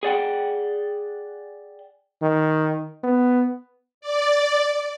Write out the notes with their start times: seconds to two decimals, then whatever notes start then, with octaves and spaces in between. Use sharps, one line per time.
0.03 G#4 D5 F#5 G5
2.22 D#3
3.03 B3
4.01 D5